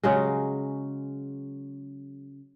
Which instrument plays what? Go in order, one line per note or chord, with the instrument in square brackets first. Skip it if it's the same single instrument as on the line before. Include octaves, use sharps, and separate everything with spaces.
[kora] C#3 F#3 G#3